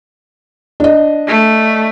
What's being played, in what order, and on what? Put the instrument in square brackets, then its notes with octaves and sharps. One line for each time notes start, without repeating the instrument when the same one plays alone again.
[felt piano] D4 D#5
[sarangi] A3